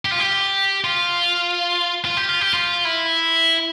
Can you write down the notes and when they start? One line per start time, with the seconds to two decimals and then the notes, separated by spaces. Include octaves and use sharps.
0.05 G4
0.12 F4
0.20 G4
0.84 F4
2.05 F4
2.17 G4
2.29 F4
2.41 G4
2.54 F4
2.85 E4